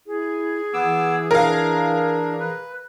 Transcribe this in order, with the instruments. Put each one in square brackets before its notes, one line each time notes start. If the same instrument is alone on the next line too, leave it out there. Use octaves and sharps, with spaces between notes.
[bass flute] E4 [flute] G#4
[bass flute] E3 [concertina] B3 D6 E6
[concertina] D4 [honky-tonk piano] A#4 F5
[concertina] B4